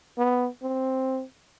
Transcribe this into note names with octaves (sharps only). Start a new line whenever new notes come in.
B3
C4